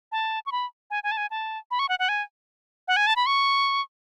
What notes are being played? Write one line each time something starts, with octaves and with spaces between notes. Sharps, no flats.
A5
C#6
B5
G#5
G#5
A5
G#5
A5
B5
C#6
F#5
F#5
G#5
F#5
G#5
A5
B5
C#6